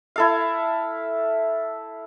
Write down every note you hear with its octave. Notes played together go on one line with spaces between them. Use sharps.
E4 A4 F5